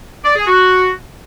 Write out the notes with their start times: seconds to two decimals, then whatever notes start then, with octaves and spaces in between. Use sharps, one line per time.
0.24 D5
0.36 G#4
0.47 F#4